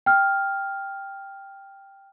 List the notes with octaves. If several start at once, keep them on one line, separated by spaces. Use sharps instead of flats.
G5 F6